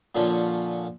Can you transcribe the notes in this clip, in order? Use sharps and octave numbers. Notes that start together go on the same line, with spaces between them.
A#2 D3 F3 C#4 F4